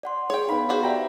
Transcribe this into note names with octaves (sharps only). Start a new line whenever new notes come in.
D5 F#5 C6
G#4 C#5 G5
B3 D#4 F5 B5
F4 F#4 G#4 C5
G4 D5 E5 G5 A#5